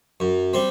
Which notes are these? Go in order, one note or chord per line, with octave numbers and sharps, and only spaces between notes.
F#2
G3 C4